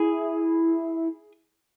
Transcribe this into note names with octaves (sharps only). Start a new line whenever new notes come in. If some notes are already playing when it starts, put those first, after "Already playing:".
Already playing: E4 G#4